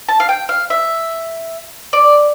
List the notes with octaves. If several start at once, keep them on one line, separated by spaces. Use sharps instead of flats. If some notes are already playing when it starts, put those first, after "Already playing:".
A5
F5
G5
F5
E5
D5